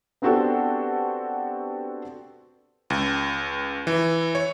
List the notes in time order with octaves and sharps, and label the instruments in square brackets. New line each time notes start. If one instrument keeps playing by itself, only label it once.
[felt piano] B3 C4 D4 F#4 G4 A4
[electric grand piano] C#2
E3
C#5